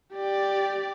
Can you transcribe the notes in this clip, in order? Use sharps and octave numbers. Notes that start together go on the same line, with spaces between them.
G4 D5